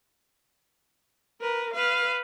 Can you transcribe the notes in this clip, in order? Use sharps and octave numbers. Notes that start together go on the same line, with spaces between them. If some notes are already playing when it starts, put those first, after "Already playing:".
A#4 B4
B4 F5